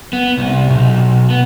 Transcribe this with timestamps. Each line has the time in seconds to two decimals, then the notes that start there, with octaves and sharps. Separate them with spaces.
0.13 B3
0.37 C2
0.69 B1
1.30 B3